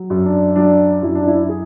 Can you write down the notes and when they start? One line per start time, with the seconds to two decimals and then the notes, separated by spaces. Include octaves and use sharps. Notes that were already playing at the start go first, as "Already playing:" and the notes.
Already playing: F#3
0.10 F#2
0.25 D4
0.56 F#3 D4
1.02 F#2 E4
1.15 D4
1.27 E4
1.49 G#4